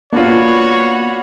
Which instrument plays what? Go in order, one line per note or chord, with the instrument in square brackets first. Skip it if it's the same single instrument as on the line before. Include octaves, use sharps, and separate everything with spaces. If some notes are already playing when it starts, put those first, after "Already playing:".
[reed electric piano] A#3 B3 [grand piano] D4 F4 [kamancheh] F#4 B5 [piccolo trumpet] C#5